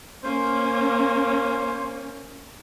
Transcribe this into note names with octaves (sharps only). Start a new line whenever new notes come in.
A#3 C#4 C5